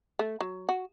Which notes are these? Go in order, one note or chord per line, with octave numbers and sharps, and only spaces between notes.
A3
F#3
F#4